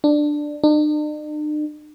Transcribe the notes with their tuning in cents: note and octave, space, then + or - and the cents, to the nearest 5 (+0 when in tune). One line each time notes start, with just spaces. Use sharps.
D4 +10
D4 +45